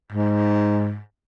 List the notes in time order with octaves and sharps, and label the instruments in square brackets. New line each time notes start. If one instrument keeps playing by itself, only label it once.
[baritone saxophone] G#2